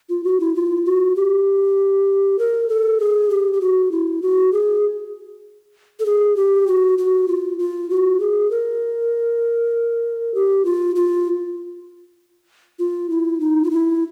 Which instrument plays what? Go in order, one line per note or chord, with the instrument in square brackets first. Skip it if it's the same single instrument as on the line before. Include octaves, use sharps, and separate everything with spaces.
[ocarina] F4
F#4
E4
F4
F#4
G4
A#4
A4
G#4
G4
G4
F#4
E4
F#4
G#4
A4
G#4
G4
F#4
F#4
F4
F4
F#4
G#4
A#4
G4
F4
F4
F4
E4
D#4
F4
E4